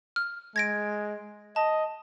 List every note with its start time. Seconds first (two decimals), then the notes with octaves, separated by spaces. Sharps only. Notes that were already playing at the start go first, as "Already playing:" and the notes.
0.16 F6
0.56 G#3 G#6 A#6 D7
1.56 D#5 A5